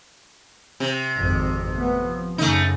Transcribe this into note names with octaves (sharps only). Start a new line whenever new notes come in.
C3
G#1 F2
A3 B3
F3
F#2 C#3 A3 D#4